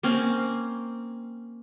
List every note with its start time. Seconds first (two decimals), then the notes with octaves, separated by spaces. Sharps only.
0.03 A#3 C4 C#4